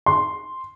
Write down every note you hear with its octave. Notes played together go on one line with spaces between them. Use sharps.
C6